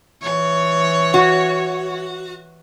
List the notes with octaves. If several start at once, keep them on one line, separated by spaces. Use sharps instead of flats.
E3 C#5
F#4